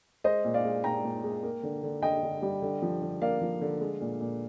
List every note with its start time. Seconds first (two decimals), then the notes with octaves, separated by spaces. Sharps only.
0.24 G#3 C5 D#5
0.45 A#2
0.54 D5 F5
0.64 G#3
0.84 A#2 G5 A#5
1.04 A#2
1.24 G#3
1.43 A#3
1.63 D3
1.83 D3
2.02 D3 D#5 G5
2.23 D3
2.42 G3
2.62 D3
2.82 F3
3.02 D3
3.22 A#3 D5 F5
3.41 F3
3.61 D3
3.81 G#3
4.01 A#2
4.21 A#2